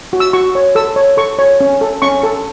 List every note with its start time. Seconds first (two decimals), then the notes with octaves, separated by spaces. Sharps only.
0.13 F#4
0.20 E6
0.33 F#4 C#6
0.55 C#5
0.75 A4 E6
0.96 C#5
1.17 A4 C#6
1.39 C#5
1.60 C#4
1.81 A4
2.02 C#4 C#6
2.23 A4